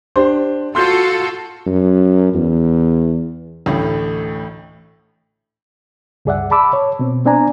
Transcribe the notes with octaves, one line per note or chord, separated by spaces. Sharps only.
D4 G4 C5
F4 F#4 A4 C6 G6
F#2
E2
A1 D2 A2
C#2 G2 G#4 D5 E5 F#5
A5 B5 D6 E6
C#5
B2 C4
B3 C4 D4 D5 G#5 A#5